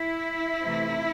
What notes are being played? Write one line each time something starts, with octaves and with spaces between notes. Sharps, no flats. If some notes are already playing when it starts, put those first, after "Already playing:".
Already playing: E4
C3 E3 A3 C4